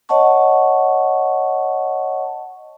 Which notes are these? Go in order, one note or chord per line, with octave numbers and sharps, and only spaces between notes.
C#5 D#5 F#5 A5 C#6